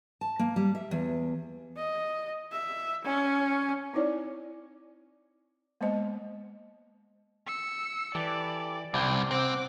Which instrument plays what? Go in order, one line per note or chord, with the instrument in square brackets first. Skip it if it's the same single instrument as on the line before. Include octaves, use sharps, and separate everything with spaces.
[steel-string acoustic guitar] A5
A#3
G3
E5
E2
[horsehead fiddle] D#5
E5
C#4
[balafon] C4 D#4 E4 C#5 D5
G#3 A#3 B3 C5 D#5
[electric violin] E6 C#7
[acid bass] E3 [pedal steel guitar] G4 A4 [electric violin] D5
[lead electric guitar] C2 [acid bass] C3 [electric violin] C4 [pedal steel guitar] D5 G5
[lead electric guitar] C4 [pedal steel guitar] F#5 [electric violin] D6